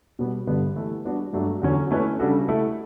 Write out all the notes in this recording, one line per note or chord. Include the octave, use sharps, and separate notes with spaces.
B2 G3 B3
G2 D3 G3 B3
E3 A3 E4
G3 B3 D4 F#4
G2 F#3 A3 D4
E2 D3 F#3 C#4
A3 C#4 E4 B4
C#3 G3 D4 F#4 A4
A3 E4 A4